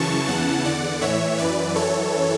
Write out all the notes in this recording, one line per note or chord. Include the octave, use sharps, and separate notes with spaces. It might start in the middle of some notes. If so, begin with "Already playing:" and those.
Already playing: F#2 C#3 E3 A5 C#6
E2 C#3 E3 F#5 A5
E2 D3 D5 F#5
A2 E3 C#5 E5
F#2 E3 B4 D5
F#2 E3 A4 C#5